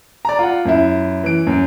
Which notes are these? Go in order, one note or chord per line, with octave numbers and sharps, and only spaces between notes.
D5 A#5
F4 F#5
F#2 E4
E3 D7
F#2